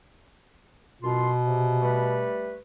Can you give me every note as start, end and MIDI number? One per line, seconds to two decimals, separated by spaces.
1.02 1.30 42
1.02 2.29 47
1.02 1.30 65
1.02 1.30 84
1.45 1.81 48
1.82 2.56 55
1.82 2.56 57
1.82 2.56 71